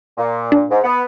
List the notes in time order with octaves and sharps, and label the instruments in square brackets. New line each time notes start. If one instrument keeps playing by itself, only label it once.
[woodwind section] A#2
[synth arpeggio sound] D4
[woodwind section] G#2
B3